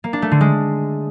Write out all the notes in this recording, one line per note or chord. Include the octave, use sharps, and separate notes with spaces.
A#3
D4
A3
D3
G#3